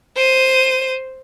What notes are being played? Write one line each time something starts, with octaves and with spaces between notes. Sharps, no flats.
C5 D#7